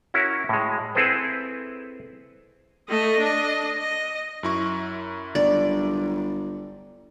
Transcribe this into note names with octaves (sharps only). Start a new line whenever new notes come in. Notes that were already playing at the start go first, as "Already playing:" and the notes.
C#4 E4 F#4 A#4
A2 G#3
C4 E4 G#4 A4 B4 C5
A3 D#5
D4 D#5
D#5
F#2 E4 C#6
G1 D5